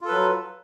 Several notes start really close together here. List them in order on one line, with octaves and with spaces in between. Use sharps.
F4 A4 B4 F#3